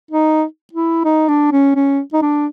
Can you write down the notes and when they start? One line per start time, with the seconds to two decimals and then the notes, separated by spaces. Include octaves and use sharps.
0.11 D#4
0.73 E4
1.05 D#4
1.28 D4
1.52 C#4
1.76 C#4
2.13 D#4
2.22 D4